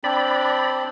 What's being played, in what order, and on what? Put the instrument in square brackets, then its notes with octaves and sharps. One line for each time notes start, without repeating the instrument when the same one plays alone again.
[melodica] C4 D4 [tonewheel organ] D5 B5